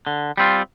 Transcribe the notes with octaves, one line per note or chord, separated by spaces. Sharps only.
D3
G3 C4 F4